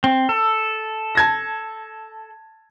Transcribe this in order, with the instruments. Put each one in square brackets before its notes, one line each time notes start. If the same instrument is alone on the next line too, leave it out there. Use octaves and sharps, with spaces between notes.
[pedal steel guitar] C4
A4
[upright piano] A5 G#6 A#6